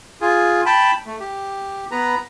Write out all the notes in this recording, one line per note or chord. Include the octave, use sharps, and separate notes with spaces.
F4 G#4
G5 A5 B5
A3
G4
B3 B4 A#5